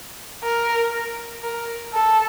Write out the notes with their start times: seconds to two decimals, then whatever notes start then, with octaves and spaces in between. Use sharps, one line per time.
0.43 A#4
1.43 A#4
1.93 A4